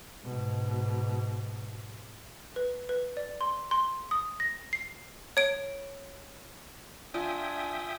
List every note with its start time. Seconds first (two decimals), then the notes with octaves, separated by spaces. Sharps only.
0.24 G#2 B2
2.56 B4
2.89 B4
3.17 D5
3.41 C6
3.71 C6
4.11 D#6
4.40 A#6
4.73 C7
5.37 C#5 D7
7.14 D4 F4 E5 G5 G#5 D#6